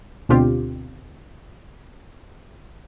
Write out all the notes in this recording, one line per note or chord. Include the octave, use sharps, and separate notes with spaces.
D2 B2 D3 C4 F4 G4